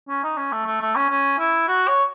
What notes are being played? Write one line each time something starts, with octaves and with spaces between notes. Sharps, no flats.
C#4
D#4
C#4
A3
A3
A3
C#4
C#4
E4
F#4
C#5